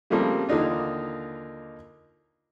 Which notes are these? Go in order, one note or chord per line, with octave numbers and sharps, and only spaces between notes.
C#3 F3 G3 A3 A#3 C4
D#2 D3 E3 D#4 F4